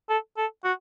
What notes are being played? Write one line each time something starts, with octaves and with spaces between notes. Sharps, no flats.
A4
A4
F#4